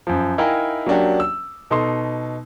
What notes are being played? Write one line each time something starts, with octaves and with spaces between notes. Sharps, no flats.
F#2 F3
D#4 E4 A#4 F5 G5 G#5
F#3 A#3 C#4 D4 F#4 G4
E6
B2 D#4 A4 C6